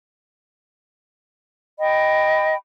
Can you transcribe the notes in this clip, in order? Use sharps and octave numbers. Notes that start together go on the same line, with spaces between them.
D#5 G5 B5